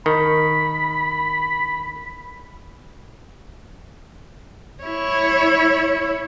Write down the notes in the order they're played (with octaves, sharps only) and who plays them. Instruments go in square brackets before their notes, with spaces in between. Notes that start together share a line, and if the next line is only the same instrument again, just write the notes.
[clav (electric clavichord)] D#3 [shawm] B5
[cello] E4 C#5